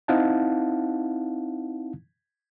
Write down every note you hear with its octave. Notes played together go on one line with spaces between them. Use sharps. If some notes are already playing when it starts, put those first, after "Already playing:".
C4 D#4 E4 F5 F#5 A5